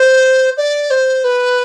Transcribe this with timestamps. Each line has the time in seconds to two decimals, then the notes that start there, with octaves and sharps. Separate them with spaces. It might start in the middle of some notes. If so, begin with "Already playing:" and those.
Already playing: C5
0.57 D5
0.90 C5
1.24 B4